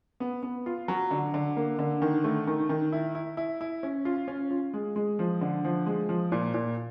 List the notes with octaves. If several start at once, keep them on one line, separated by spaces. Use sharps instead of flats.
B3
B3
F4
F#3
D3
D3
A#3
D3
D#3
A3
D#3
D#3
E4
E4
E4
E4
C#4
F4
C#4
F4
G#3
G#3
F3
D3
F3
G#3
F3
A#2
A#2